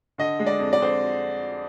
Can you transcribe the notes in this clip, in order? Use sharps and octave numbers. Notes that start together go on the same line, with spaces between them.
D3 D#5
G#3
D5
F2
D5
F2 C5